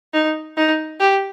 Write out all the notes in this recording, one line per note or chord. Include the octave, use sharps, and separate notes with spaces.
D#4
D#4
G4